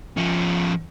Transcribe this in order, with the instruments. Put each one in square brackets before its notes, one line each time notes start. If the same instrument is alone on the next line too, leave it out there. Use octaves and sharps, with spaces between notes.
[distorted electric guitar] F3 C#4